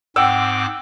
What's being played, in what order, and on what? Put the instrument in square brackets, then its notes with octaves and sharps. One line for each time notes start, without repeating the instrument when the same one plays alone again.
[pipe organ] G#2 C4 D6 [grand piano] F#5 G5 E6